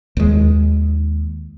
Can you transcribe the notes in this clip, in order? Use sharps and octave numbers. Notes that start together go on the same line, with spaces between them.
D#2 G#3